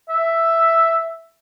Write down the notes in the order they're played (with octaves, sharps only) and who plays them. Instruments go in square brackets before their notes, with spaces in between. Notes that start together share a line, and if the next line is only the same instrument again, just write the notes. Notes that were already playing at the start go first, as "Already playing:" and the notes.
[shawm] E5